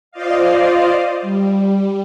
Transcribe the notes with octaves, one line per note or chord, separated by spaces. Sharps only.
F4 C5 D5 D#5 F5
G3